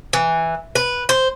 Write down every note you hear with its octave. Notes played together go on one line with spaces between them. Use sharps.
E3
B4
C5